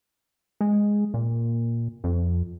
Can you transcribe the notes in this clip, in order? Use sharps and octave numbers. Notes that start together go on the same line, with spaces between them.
G#3
A#2
F2